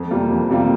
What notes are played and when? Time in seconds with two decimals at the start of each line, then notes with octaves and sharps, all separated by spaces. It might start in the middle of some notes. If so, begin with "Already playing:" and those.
Already playing: F2
0.11 C3 G3 A#3 F4
0.30 F2
0.50 C3 G3 A#3 F4